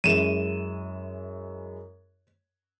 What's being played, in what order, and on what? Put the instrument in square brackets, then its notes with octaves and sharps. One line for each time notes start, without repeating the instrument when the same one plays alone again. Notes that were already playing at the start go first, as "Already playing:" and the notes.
[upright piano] F#2 G#3 E4 [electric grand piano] D#7 E7